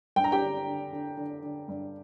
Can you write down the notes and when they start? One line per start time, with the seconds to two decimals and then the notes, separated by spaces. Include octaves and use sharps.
0.16 G2 G5
0.24 A#5
0.32 G4 G5
0.42 D3
0.67 D3
0.93 D3
1.17 D3
1.43 D3
1.68 G2